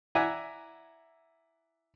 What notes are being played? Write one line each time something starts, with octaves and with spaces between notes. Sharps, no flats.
E4 D5 E5 F#5 G#5 A#5